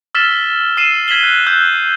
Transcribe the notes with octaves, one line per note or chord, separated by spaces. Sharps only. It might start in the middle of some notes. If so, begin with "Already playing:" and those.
E6 F6 A6 B6 E7 G7
E6 C7 D#7 E7
F6 G#6 B6 E7 F#7 G7
F#6
E6 F#6 G6 G7